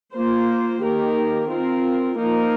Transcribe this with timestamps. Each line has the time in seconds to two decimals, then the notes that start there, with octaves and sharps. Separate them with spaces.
0.13 A#3 F4 C5
0.81 D#3 A#3 G4 A#4
1.49 C4 F4 A#4
2.16 F3 A#3 D#4 A#4